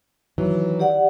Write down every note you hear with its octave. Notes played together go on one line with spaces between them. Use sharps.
D#3 E3 F#3
G4 D5 F#5